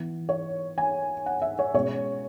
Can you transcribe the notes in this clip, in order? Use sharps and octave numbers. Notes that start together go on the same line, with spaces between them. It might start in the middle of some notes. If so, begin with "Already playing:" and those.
Already playing: E3 B3
C#5
G#5
F#5
E5
C#5
B2 G#3 C#4 C#5